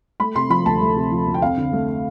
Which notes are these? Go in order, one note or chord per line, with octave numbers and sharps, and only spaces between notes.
A3 B5
C3 C6
F3 B5
D2 A5
A3
C3
F3
D2
G5
F2 F5
D3
A3